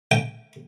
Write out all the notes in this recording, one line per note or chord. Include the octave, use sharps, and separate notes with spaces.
G5